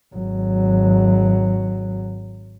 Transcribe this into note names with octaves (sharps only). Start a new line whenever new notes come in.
G#1 F#3